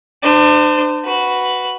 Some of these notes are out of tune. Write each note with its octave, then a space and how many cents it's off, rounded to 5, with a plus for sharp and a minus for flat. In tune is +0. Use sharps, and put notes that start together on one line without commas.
D4 +35 C5 -25
F#4 +0 B4 +0